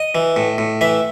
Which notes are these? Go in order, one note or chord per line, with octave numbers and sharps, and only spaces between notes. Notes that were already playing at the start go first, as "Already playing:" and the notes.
Already playing: D#5
E3
A2
A2
E3 E5